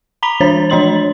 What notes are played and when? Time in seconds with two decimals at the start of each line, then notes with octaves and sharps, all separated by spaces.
0.23 A#5 B5 B6 F7 G7
0.40 E3 D4 C#5 A6
0.70 F3 D4 D#5 C6 A6 F#7